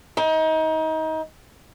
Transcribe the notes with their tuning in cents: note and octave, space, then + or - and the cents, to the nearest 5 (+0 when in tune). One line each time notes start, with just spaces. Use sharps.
D#4 +30